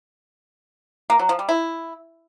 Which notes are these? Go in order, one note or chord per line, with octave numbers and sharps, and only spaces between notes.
A#3
F#3
F3
G3
E4